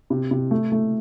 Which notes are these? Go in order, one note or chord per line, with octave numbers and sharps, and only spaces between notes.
C3
C3
A3
A3